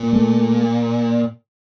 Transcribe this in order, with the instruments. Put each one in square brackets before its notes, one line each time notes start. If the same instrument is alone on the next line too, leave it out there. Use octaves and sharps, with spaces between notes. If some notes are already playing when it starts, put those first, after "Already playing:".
Already playing: [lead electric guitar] A#2
[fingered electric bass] A3